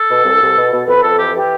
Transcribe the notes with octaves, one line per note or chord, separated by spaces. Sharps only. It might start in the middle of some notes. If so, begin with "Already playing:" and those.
Already playing: A4
B2
C2
C2
B2
B2
F2 B4
F2 A4
E3 G4
E3 G4